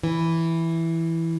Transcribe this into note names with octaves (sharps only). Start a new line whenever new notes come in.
E3